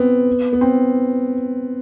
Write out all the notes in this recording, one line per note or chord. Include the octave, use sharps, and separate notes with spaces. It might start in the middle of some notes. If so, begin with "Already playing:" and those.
Already playing: B3 C4
B3
C4